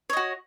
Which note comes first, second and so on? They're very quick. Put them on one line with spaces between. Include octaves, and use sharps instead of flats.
C#5 D#5 F#4